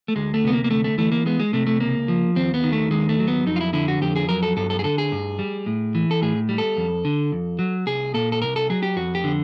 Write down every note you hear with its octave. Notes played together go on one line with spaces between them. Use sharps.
A3
D2 G#3
A3
C3 B3
A#3
A#3
D2 A3
A3
E3 A3
A#3
G#3 B3
G#3
C3 A3
A3
C#2 A#3
F3
D#2 C4
B3
D#3
A3
D#2 G#3
A3
F#3
B3
F2 D#4
F4
E4
D3 E4
F#4
F2 G4
G#4
F#3 A#4
A4
G2 A4
A4
G#4
D3 A4
G#4
G2
G3
A2
E3
A4
A2 G#4
G3
A4
F2
D3
F2
F#3
C2 G#4
A#2 A4
A4
C2 A#4
A4
F#3 G#4
G4
F2 F#4
G4
D3